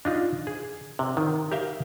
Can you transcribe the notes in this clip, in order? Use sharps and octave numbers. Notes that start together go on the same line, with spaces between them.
D4 D#4 F4
G#4
C3
D#3
G4 A#4 E5 F5 G5